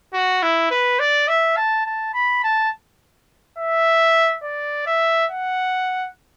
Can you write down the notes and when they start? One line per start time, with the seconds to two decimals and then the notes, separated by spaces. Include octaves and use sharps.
0.14 F#4
0.42 E4
0.71 B4
0.99 D5
1.28 E5
1.56 A5
1.86 A5
2.14 B5
2.43 A5
3.58 E5
4.43 D5
4.86 E5
5.30 F#5